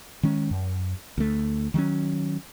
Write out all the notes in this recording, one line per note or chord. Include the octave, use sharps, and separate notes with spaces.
D#3 G#3 C#4
F#2
D2 A3
D#3 F#3 G3 C#4